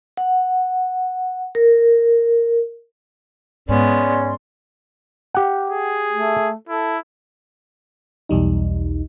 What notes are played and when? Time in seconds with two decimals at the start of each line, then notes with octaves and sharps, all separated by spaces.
0.17 F#5
1.55 A#4
3.69 G#2 G#3 B3 C#4 D5 C6
5.34 G4 F#5
5.69 G#4
6.12 A3
6.69 E4 A4
8.29 B1 E2 G3 D#4